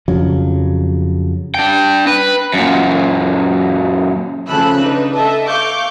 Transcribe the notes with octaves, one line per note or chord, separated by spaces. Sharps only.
F2 C#3 F3 F#3
D4 G5
B4
F#2 A#2
C#3 F3 A3 B5 E6 F#6
D4 D#4 B4
A4 D#5 E5 A5
F5 C#6 D6 G6